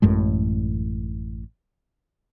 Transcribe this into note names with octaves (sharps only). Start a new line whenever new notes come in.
A1 F#2 A2 G#3